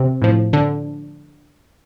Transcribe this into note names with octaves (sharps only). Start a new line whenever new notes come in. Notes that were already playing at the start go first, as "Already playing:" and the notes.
Already playing: C3 C4
A2 F3
D3 D4